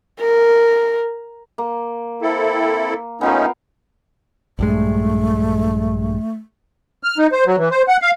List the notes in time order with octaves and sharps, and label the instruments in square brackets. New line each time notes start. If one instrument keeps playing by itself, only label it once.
[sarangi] A#4
[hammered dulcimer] A#3
[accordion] C4 E4 A4
[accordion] A3 C#4 D#4 [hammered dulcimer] B3 F4 A#4
[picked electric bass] A#1 G2 G#3 [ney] A3
[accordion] F6
D#4
C5
F#3
E3
C5
F#5
F5